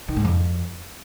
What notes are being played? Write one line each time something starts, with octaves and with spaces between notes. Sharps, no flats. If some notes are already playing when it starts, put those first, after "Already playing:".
D#3
G#2
F2